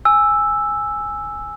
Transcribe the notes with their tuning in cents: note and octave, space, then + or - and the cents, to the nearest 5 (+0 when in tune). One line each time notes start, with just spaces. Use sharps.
G#5 +0 E6 +0